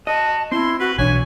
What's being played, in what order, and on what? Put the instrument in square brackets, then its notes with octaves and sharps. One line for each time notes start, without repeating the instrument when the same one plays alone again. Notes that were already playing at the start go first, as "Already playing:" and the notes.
[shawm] F#4 [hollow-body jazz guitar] D#5 [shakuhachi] A5
[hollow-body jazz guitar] C4 [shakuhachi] E4 [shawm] C6
[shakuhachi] F#4 [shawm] B4
[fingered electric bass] B1 [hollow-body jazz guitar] E3 F#3 D4 [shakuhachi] C#5 [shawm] G#5